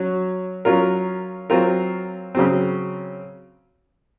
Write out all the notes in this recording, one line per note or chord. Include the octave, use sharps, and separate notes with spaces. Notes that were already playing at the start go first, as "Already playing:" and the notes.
Already playing: F#3 C#4 F#4
F#3 C#4 F4 A#4
F#3 C4 F4 A#4
C#3 F#3 C4